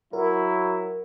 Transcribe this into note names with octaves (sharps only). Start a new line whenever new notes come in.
F#3 E4 A#4